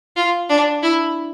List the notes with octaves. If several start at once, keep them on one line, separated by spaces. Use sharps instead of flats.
F4
D4
E4